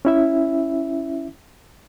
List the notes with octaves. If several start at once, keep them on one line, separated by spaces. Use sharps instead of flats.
C#4 E4 E5